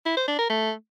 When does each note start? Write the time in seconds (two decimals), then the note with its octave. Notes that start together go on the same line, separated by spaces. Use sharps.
0.06 E4
0.17 C5
0.28 D4
0.39 A#4
0.50 A3